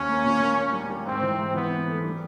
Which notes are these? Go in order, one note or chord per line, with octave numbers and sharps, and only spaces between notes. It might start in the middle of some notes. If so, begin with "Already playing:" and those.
Already playing: D#2 C#4
A#3
A#2
A#3
A#3
G3
G3
G#2 C4
E3
G#2
E3 B3
E3
A3
G3